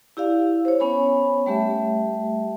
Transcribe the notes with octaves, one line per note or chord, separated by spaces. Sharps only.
E4 G4 D5 F5
C5 C#5
B3 C#4 C#5 G#5 B5
G3 A3 G4 E5